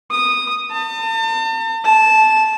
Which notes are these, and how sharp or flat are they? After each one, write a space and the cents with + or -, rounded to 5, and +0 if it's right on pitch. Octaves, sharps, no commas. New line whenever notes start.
D#6 -10
A5 +40
A5 -10